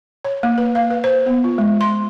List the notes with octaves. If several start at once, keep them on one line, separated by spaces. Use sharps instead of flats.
C#5
A#3
B4
F5
B4
C5
B3
F4
G#3
C6